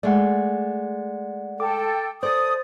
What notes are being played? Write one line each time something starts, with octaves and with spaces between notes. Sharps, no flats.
G#3 A3 D5 F#5
A4 G5 D6
A4 C5 D5 D#6 A6